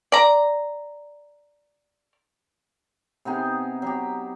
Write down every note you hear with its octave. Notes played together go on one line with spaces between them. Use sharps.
D5 A#5
C3 B3 D#4 G#4
F#3 G4